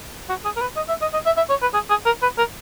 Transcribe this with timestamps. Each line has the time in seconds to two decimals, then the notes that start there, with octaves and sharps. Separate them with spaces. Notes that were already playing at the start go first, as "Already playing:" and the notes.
0.29 F#4
0.45 G#4
0.56 A#4
0.61 B4
0.76 D#5
0.89 E5
1.02 D#5
1.13 D#5
1.26 E5
1.37 E5
1.50 C#5
1.62 B4
1.74 G#4
1.90 G#4
2.06 A#4
2.22 B4
2.38 A#4